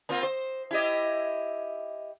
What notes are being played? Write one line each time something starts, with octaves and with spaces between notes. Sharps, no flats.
A#3 C4 F4
C5
E4 G4 D#5